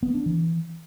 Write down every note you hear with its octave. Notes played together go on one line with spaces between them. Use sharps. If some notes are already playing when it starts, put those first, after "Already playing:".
B3
D4
E3